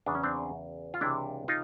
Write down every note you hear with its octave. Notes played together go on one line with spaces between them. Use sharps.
E2 C#3 F#3 D4
C#4
C4 D4
F4
C#2 C3 E3 D4 E4
D#4 F4